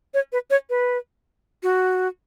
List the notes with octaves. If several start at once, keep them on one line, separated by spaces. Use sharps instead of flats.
C#5
B4
C#5
B4
F#4